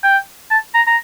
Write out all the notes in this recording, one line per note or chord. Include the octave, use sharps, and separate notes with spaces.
G5
A5
A#5
A#5